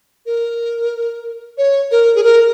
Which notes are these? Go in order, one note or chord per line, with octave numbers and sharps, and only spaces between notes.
A#4
C#5
A#4
G#4
A#4